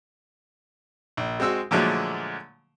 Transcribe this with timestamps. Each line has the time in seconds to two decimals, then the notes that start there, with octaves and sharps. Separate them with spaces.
1.17 A#1
1.40 G#3 C4 F#4 E6
1.71 A#2 D3 F3 F#3 G#3 A3